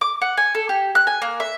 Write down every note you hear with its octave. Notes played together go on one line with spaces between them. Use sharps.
D6
F#5
G#5
A4
G4
F#6
G#5
A#3
E5